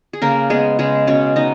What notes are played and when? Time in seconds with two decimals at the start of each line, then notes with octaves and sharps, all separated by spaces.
0.13 G#4
0.21 C#3 A#3 A#4
0.50 G#3 B3 G#4
0.79 C#3 G#3 G#4
1.07 B2 C#4 C#5
1.36 B3 D#4 D#5